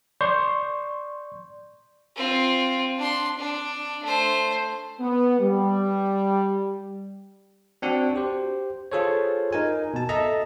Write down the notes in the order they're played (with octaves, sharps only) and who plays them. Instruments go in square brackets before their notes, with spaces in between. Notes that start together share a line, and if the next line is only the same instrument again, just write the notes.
[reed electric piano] D5 C6 C#6 G6
[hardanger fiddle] C4 F4
D4 C6
D4
A3 C5
[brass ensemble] B3
G3
[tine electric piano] C4 D4 F#4
G4 C5
F4 G#4 A4 C5 C#5
D#4 A#4 G#5
B2 A5
A4 D#5 E5 A5 A#5